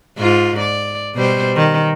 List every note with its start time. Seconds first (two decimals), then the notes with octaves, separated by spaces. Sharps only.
0.18 G#2 F4
0.60 D5
1.15 B2 G3 C5
1.56 D#3